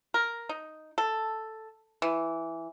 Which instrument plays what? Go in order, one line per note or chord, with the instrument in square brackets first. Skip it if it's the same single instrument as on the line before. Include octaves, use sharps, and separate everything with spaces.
[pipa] A#4
D#4
A4
E3